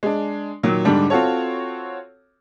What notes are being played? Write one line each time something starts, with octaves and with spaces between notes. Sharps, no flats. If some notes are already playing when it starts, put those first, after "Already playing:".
G#3 D4
A#2 D#3 F#3
G#2 D3 G3 D4
C4 F4 F#4 A4 C#5